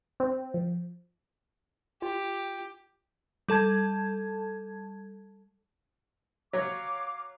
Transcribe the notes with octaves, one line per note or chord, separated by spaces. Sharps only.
C4
F3
F4 G4
G3 A4 A5 G#6
F#3 C#5 F5 D6